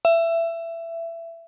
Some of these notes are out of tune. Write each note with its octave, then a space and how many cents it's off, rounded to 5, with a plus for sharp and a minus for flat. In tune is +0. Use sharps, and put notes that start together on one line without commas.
E5 +20